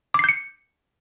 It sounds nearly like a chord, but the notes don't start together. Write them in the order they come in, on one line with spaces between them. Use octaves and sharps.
D6 C7 G6 C#7